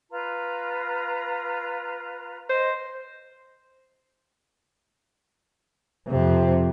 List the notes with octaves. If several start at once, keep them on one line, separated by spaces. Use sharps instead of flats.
F4 B4 A#5
C5 D#5
F2 C3